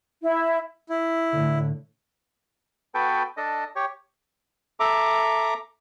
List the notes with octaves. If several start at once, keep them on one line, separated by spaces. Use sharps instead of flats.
E4
E4
A2 D3
B3 F#4 A4 B4 G5
D4 A4 D#5
G4 C#5
A4 E5 A#5 D6